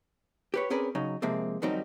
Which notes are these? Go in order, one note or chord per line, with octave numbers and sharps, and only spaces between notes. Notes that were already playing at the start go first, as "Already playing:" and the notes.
G4 B4 C#5
C4 C#4 G#4 A#4 B4 D5
C#3 F#3 D#4
C3 F3 G#3 A#3 C4
F2 D#3 F#3 G3 C4 D#4